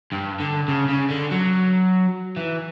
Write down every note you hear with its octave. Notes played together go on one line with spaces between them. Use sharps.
G2
D3
C#3
C#3
D3
F#3
E3